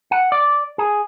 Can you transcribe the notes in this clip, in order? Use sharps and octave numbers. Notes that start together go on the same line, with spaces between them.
F#5
D5
G#4